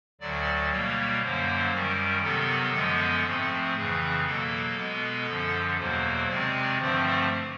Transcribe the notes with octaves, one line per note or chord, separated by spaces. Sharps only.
D2 D3 F#3 D5
B2 G3 A#3 C#5
F#2 D3 F#3 A#3 C5
F#2 D#3 G3 A#4
C3 D#3 F#3 B3 A4
F#2 D3 F3 G#3 B3
G#2 F3 A3 C4
F2 C#3 E3 G#4
B2 F#3 A#3 A4
B2 G#3 B3
F#2 D3 F3
E2 B2 F#3 A#3 C5
C3 D#3 G#3 C4 D5
G2 D3 F3 A3 C4 C5